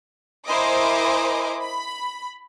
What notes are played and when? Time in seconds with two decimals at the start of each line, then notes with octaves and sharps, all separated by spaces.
0.47 E4 A#4 C5 D#5 G#5 D6
1.61 B5